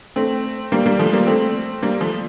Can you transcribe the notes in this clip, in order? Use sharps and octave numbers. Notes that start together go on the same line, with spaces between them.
A3 C4
G3 A#3
G3 A#3
F3 A3
G3 A#3
A3 C4
G3 A#3
F3 A3